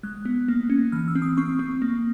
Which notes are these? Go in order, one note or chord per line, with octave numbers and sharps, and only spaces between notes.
G#3 F#6
B3
A#3
C#4
E3 F6
E6
C4
D#6
C4 C#6
C4
A#3